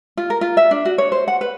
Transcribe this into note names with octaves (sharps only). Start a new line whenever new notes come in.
F4
A#4
F4
E5
D4
F#4
C#5
C5
F#5
B4